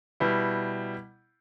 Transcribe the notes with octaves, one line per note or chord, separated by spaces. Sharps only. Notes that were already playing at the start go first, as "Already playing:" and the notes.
B2 G3 E4